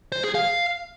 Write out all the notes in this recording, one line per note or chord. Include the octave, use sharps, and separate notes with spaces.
C5
G#4
F5